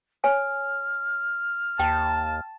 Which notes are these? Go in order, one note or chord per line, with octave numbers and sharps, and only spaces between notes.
C#5 G#5 F6
D#2 G5 A5